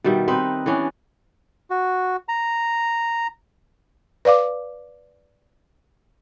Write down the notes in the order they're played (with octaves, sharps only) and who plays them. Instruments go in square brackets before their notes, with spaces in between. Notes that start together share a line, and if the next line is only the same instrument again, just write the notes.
[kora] B2 D#3 G3 E5
C4 D#4 B4 D#5
E3 B3 C#4 D4
[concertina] F#4
A#5
[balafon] B4 D5 F5 D6